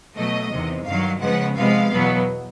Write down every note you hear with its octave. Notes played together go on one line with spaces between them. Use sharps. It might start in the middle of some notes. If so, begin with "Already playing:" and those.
B2 F#3 A3 D#5
E2 C3 D#3
G2 D#3 F#3 F5
C#3 F3 G#3 B3 F#5
C3 F3 G#3 B3 F5
E2 B2 F#3 B3